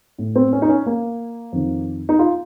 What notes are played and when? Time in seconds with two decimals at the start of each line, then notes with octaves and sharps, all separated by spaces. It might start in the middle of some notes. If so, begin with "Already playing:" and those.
0.18 A2
0.36 C4
0.53 C#4
0.62 D#4
0.69 C#4
0.86 A#3
1.52 F2 D#3
2.09 D#4
2.19 F4